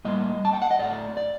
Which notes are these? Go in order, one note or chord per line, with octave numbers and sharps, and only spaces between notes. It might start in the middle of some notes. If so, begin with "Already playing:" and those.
A2 G3 A#3 D#5
A5
G5
F#5
D#5
A2 A3 D5
D5